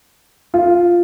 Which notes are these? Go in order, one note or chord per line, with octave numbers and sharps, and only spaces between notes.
F4